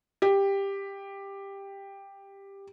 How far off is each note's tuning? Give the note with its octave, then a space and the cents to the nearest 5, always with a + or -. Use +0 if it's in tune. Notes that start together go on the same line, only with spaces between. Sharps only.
G4 +10